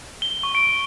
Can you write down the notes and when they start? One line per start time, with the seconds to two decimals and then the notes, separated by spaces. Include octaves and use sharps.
0.22 G7
0.43 C#6
0.55 D7